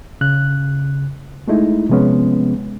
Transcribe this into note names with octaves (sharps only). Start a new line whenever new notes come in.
C#3 F#6
G#3 A3 D#4 E4
C3 F3 G#3 B3 C#4